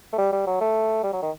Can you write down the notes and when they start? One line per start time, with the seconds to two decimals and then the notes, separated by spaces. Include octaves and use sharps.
0.13 A3
0.18 G3
0.32 G3
0.47 F#3
0.61 A3
1.03 G3
1.13 F#3
1.22 D#3